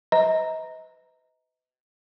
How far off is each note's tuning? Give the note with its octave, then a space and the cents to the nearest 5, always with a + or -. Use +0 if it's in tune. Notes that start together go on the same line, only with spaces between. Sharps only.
B4 +35 D#5 +35 A#5 +0